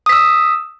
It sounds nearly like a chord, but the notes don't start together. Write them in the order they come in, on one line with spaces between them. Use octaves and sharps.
D#6 B6 E6